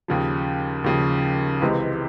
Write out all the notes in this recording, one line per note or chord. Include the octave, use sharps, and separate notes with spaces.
D#2 C#3 F3
D#2 C#3 F3
C#2 C3 E3 G#3 C4